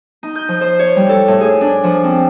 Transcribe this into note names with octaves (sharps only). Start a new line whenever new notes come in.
D#4
G6
F3
C5
C#5
G3
A4
A2
G#4
D4
F3
C4